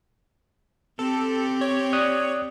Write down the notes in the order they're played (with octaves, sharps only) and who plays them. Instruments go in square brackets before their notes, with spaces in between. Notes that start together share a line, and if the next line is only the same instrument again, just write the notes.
[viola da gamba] C4 G4 [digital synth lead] A4
[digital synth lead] C#5
[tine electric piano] D5 D#6 F#6